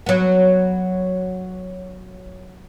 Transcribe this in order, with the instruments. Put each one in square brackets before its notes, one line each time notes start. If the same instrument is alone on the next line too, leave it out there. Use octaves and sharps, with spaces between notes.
[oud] F#3 B3